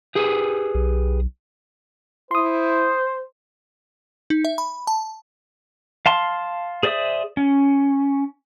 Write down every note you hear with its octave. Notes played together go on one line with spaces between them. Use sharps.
G4 G#4 B4
B1
E4 C5 C6 D#6
D#4
E5
B5
A5
F5 A5 C6
G#4 C5 D5 E5 D#6
C#4